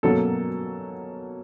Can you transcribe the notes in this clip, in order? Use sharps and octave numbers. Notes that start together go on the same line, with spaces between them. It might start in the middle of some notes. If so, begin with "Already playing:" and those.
B2 F#3 A#3 C#4 A4